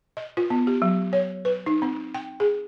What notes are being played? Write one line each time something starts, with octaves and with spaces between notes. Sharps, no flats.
D#5
F4
B3
G4
F#3
C#5
B4
D#4
C4
G5
G#4